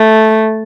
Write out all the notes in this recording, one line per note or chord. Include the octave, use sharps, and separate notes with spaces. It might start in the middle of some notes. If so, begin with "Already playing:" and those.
Already playing: A3